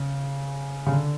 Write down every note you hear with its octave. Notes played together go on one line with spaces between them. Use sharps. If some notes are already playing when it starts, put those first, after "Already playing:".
Already playing: C#3
C#3
D3